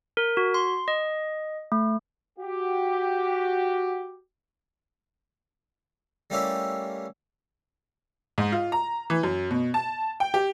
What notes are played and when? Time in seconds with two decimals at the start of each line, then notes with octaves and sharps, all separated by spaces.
0.17 A#4
0.37 F#4
0.54 C6
0.88 D#5
1.72 A3
2.39 F#4 G4
6.30 G3 A3 A#3 C#4 E4 G4
8.38 G#2
8.52 F4
8.72 A#5
9.10 E3
9.23 F#2
9.51 B2
9.74 A5
10.20 G5
10.34 G4